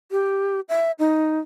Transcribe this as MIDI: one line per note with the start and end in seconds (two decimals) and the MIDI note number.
0.11 0.60 67
0.69 0.91 76
0.99 1.39 63